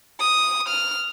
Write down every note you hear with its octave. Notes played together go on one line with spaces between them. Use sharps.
D#6
F6